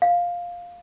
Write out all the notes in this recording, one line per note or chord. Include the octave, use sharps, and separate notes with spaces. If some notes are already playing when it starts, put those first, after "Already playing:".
F5